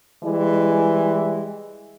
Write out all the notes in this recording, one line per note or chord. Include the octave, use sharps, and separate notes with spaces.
E3 G3 G#3 E4